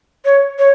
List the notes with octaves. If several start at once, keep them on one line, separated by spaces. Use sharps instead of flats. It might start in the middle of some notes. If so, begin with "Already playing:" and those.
C#5
C#5